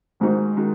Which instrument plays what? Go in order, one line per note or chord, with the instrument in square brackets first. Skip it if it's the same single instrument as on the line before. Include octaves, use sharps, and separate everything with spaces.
[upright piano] D#2 D#3 G#3 D#4 F#4 [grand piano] G#2
[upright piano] D#3 G#3 D#4 F#4